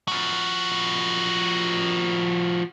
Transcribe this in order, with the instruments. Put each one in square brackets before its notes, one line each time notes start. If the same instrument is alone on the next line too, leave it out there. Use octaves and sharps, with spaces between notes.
[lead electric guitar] F3 F#4